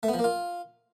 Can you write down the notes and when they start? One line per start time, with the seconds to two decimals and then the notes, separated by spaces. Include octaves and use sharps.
0.03 A3
0.08 B3
0.14 F3
0.19 A#3
0.24 F4